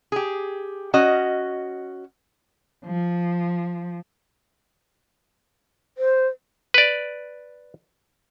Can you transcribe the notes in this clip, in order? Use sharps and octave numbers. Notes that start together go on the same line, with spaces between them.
G4 G#4
C#4 F#4 D#5
F3
C5
B4 D5